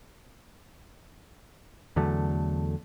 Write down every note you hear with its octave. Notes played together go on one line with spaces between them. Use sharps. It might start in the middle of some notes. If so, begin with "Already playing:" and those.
E2 D3 F#3 A3